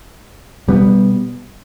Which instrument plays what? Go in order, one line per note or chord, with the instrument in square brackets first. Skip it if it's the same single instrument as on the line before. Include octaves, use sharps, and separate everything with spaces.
[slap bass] B2 G3 B3